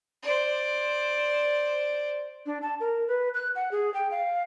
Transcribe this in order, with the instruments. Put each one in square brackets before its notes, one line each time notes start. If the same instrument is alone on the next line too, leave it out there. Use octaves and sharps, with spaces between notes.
[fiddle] C5 D5
[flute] D4
A5
A#4
B4
F#6
F#5
G#4
G5
F5